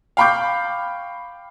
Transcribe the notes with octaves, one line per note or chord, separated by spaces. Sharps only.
F5 G5 B5 C#6 D6 G6